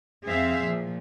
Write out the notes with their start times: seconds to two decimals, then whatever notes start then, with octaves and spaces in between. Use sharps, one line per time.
0.25 F2 C4 G#4 C5 E5 F5
0.61 A#2 F3